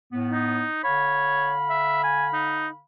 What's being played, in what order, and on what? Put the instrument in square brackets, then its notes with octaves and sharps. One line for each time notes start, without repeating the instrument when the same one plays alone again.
[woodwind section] A2 B3
[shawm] D#4
[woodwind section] D3 F5 B5 [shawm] C#5
[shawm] E5
G#5
D#4